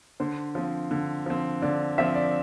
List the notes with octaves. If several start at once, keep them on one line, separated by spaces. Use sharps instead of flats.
D3 C5
F3 C4
D3
F3 C4
D3 D5
F3 C4 E5
D5